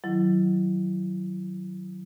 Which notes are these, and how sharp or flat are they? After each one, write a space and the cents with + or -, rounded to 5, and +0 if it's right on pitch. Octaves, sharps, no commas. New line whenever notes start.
D#3 +0 F#3 +0 E4 +25